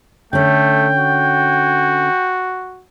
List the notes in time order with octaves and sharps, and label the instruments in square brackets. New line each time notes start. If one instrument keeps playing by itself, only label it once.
[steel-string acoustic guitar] D3 C#4 [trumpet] A3 [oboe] G5
[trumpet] F#4